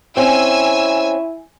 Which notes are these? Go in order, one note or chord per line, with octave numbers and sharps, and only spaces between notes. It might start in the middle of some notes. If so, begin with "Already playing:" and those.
C4 C#4 E4 G#5 E6